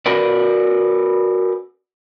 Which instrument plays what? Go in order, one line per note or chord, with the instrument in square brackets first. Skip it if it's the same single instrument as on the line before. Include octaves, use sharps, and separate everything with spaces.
[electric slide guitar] F#4 A#4 B4 D5